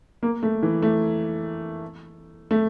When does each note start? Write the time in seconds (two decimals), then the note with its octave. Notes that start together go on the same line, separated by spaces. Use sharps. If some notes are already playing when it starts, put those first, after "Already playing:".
0.23 A#3
0.43 A3
0.63 E3
0.82 A3
2.51 A3